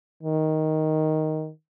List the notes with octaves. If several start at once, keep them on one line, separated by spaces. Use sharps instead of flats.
D#3